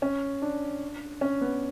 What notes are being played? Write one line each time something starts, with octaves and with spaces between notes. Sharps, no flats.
C#4
D4
C#4
B3